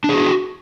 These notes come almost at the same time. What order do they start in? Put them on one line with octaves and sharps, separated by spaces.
D4 G#4 F#4